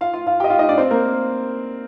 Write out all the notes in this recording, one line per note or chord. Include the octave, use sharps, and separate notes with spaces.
F4 F5
F4 F5
F4 F5
G4 G5
D#5
F4 F5
D#4 D#5
D4 D5
C4 C5
A#3 A#4